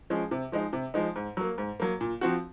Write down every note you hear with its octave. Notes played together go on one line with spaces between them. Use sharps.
F3 G#3 C#4 G#4
C3
F3 G#3 D#4
C3
F3 G#3 D#4
G#2
F#3 A#3
G#2
F#3 A#3
A#2
F3 C4 F#4